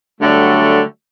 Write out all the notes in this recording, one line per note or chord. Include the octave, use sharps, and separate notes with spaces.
D3 F#3 G3 A3